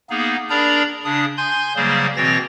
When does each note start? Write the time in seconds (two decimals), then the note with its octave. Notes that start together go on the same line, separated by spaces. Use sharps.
0.10 A#3 B3 D#4 G#4
0.50 D4 G#4 A#4 D5 A#5 B5
1.05 C#3 D4 D#6
1.38 G#5 C6 G6
1.76 C#3 F#3 G3 A#3 G#4 C5
2.17 B2 E3 C4 C#5 A6 A#6